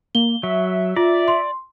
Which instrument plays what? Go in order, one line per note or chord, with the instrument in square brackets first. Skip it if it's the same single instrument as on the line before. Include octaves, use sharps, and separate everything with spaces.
[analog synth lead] A#3 [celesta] G7
[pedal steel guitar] F#3 [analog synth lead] E5
[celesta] F4 [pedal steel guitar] D5
[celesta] C6